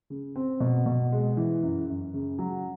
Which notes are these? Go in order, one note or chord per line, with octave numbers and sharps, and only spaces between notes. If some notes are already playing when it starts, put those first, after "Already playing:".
C#3
C4
B2
B2
G#3
E3
F#2
F#2
C#3
F#3